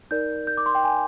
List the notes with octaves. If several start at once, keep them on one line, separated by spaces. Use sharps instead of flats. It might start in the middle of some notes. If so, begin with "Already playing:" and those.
D#4 A#4 D5 G6
G6
D6
C6
G5
G#5